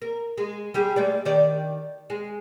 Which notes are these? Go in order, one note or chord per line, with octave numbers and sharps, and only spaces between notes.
A#4
G#3
G3 G4 G#4
G#3 A3 D5
D#3 G4 D5
G#3